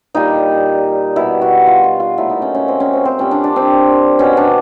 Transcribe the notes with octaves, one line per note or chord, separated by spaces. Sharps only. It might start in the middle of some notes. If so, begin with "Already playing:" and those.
A#2 G3 D#4
B2 G3 E4
F#4
F4
F4
F4
A#2 F#3 A3 E4
D#4
C#4
C#4
C4
C#4
C4
C4
A#2 G3 C#4
D4
D4
C4
B2 G3 C#4
D4